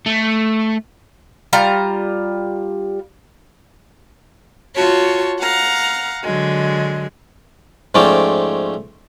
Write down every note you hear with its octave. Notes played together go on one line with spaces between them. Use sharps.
A3
G3 F4 A#5
F4 F#4 C#5 A5
F5 F#5 A#5
D3 F#3 G#3
G#2 F3 A3 C#4 D5 G5